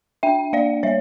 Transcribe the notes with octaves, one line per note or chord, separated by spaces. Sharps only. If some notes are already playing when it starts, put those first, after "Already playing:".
D4 E5 G5
A#3 D5 F5
G3 C#5 E5